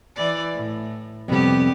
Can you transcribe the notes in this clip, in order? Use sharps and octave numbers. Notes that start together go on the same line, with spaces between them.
E3 D5
A2
F2 C3 G3 B3 G4